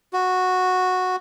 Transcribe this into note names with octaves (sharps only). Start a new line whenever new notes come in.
F#4